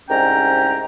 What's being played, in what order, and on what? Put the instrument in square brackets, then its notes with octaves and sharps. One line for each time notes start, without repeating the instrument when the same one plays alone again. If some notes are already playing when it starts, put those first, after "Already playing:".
[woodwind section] C2 G#2 C#4 G5 A#5